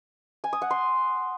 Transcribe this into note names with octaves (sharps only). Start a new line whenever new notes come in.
G#5
D#6
F#5
C6